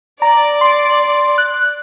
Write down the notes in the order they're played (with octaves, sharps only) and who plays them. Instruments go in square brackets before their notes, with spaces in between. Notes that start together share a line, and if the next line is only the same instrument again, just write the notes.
[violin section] D5 [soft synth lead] A#5
[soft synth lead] C6
F#6